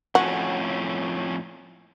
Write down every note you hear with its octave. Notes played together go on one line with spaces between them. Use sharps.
F2 A2 C#4 F#4